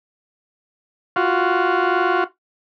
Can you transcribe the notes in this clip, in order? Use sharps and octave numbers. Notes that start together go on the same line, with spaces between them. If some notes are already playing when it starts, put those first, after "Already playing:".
F4 F#4